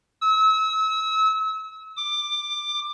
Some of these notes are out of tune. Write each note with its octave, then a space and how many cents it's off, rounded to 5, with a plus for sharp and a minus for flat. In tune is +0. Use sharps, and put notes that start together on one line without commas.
E6 -35
D6 +15